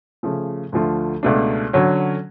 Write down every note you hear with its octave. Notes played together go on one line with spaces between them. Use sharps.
C#3 F3 A3
D2 D3 F3 A3 F4
C#2 B2 A3 D4
D3 F#3 C#4